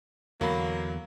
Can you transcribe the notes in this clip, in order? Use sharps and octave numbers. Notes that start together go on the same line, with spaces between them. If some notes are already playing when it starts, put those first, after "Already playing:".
E2 D3 F#3 A#3 B5